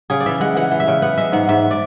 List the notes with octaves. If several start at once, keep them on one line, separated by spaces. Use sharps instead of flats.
C#3 G#4
D5
E3 E5
G#3 F#5
E3 F#5
E3
E5
C#3
B3 F#5
G#3 E5
G#2 F#5
G#2 E5
D5